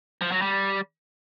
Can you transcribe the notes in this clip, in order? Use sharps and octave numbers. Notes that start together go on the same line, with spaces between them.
F3
F#3
G3